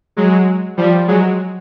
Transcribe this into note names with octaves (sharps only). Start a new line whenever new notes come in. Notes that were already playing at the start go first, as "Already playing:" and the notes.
F#3 G#3
F3 G3
F#3 G#3